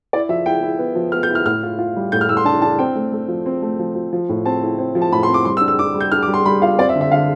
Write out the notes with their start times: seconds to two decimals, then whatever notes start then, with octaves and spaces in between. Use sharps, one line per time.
0.13 E4 D5
0.29 F3 E5
0.46 E4 G5
0.63 E4
0.79 B3
0.95 F3
1.12 B3 F6
1.23 G6
1.30 E4
1.35 F6
1.46 A2 F6
1.63 F4
1.79 F4
1.96 G3
2.12 A2 G6
2.21 F6
2.29 A2 E6
2.37 C6
2.45 D4 A5
2.62 D4 A5
2.79 C4 G5
2.95 A3
3.13 A3
3.28 F3
3.46 C4
3.62 A3
3.79 F3
3.95 F3
4.13 F3
4.29 A2
4.45 C4 A5
4.63 E4
4.79 C4
4.95 F3
5.02 A5
5.12 A2 B5
5.23 C6
5.28 C4
5.34 D6
5.45 G3 C6
5.57 E6
5.61 D4
5.68 E6
5.79 D4 D6
5.94 G3
6.00 G6
6.12 D4 F6
6.23 D6
6.28 G3
6.34 C6
6.45 G3 B5
6.62 F4 F5
6.79 C4 D5
6.89 E5
6.95 D3
7.01 E5
7.11 D3 F5